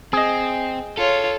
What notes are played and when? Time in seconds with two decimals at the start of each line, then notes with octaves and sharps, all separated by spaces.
0.13 C4 G#4 D#5
0.98 F4 A4 C#5